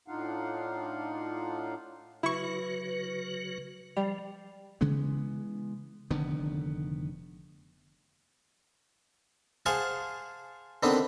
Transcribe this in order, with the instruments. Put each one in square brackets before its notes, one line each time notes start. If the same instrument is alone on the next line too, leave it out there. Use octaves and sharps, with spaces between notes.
[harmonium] A2 D4 D#4 F4 F5 F#5
[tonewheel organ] C#3 F#3 F#4 [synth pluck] E4 C#6 [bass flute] B4
[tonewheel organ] F3 [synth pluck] G3
[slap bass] C#3 E3 G#3 B3
F1 D3 D#3 B3
[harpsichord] G#4 C5 F5 F#5 G#5 A5
D3 D#3 B3 C4